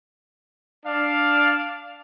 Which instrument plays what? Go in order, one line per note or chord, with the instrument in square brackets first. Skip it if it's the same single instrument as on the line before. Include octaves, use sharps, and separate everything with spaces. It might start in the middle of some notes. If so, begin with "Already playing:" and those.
[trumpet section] D4 D5 F5